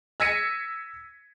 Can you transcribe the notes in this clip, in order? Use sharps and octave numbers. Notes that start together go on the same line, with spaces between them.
E6 G#6 A#6 B6 C#7 D#7